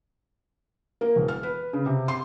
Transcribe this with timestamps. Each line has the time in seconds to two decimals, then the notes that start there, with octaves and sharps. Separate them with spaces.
1.01 A#3
1.16 E1
1.28 F6
1.43 B4
1.73 C#3
1.86 C3
2.08 C6